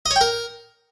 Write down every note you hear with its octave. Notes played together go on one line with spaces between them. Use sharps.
D#5
C#5
G5
A#4